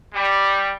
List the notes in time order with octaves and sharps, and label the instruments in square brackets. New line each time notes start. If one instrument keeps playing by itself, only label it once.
[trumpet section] G3